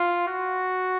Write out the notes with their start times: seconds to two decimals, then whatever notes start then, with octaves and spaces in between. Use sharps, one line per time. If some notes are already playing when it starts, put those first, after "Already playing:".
Already playing: F4
0.28 F#4